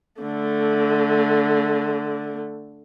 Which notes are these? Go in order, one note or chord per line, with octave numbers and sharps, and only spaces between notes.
D3 A3